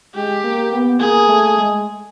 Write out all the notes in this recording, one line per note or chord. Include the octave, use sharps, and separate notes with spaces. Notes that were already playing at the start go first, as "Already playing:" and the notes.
G#3 G4
A#3
B3
A#3 G#4
A3
G#3